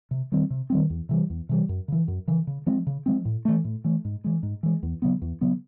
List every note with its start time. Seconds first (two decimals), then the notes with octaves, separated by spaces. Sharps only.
0.11 C3
0.32 D#3 G3 C4
0.50 C3
0.70 D#3 G3 C4
0.90 E2
1.09 C3 E3 G3
1.30 E2
1.49 C3 E3 G3
1.69 F#2
1.88 C#3 E3
2.08 F#2
2.28 C#3 E3
2.47 C#3
2.66 F3 G#3 C4
2.87 C#3
3.06 F3 G#3 C4
3.25 A2
3.45 E3 A3
3.65 A2
3.84 E3 A3
4.05 G#2
4.24 E3 G#3
4.43 G#2
4.63 E3 G#3
4.83 E2
5.02 C#3 F#3 B3
5.22 E2
5.41 C#3 F#3 B3